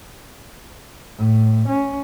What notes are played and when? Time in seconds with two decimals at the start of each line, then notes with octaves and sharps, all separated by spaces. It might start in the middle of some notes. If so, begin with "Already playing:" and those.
1.18 A2
1.68 C#4